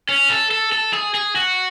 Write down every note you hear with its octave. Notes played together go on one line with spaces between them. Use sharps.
C#4
A4
A4
A4
G#4
G#4
F#4